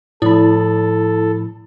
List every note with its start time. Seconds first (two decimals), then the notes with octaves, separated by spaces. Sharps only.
0.22 A2 F3 E4 A4 B5